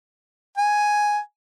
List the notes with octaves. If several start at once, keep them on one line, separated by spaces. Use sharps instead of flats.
G#5